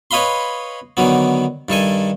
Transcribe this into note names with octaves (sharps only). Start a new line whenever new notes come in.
B4 C#5 D#5 F5 B5 C6
D3 D#3 F#3 B3
G2 D#3 A4 G#5